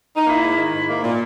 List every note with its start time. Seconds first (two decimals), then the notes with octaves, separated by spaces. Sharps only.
0.16 D#4
0.27 A#3 E4
0.42 G#2
0.57 D#3
0.73 G#2
0.88 A#3
1.03 A#2